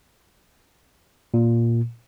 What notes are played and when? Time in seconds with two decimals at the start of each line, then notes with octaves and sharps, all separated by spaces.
1.34 A#2